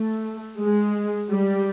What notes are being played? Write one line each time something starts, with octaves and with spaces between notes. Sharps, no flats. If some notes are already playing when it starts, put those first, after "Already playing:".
Already playing: A3
G#3
G3